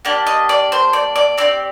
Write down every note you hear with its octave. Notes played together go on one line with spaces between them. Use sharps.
A#3 D4 G4 D5
D#5
D5
C5
D5
D5
C4 G4 D5